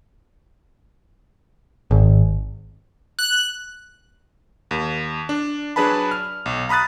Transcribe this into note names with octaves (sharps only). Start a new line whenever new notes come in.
G#1
F#6
D#2
D4
F#3 D4 G#4 B4 A5 B5
F6
B1
A#5 B5 D#6 F#6 A6